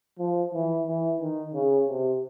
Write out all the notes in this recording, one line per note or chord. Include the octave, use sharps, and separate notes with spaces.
F3
E3
E3
D#3
C#3
C3